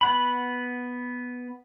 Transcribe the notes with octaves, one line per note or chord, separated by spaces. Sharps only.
B3 F#5 B5